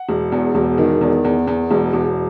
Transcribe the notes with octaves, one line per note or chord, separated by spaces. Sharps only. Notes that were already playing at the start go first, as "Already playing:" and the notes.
Already playing: F#5
E1
E2
E1
D#3
E2
E2
E2
E1
E1